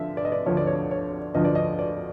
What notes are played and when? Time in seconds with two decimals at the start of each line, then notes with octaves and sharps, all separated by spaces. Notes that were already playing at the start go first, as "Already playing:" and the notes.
Already playing: D3 F3 E5
0.17 D5
0.25 D#5
0.32 D5
0.46 D2 D3 F3 C#5
0.57 D5
0.67 C#5
0.91 C#5
1.35 D2 D3 F3 D#5
1.45 D5
1.55 D#5
1.79 D5